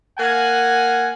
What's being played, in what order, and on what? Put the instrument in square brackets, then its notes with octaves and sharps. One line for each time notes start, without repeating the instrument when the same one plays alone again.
[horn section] A#3 F#5 G#5